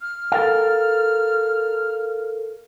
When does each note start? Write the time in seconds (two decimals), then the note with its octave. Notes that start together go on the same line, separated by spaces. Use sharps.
0.01 F6
0.32 A4 A#4 F5